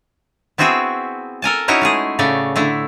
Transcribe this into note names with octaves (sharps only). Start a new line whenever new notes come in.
B3 C4 E4 F#4 G#4 E5
A4 A#4 G#5 A5
C#4 D#4 E4 F#4 C#5 D#5
G#3 A3 G#4
A2 C#3 A3 C#5 D5
D3 A3 E4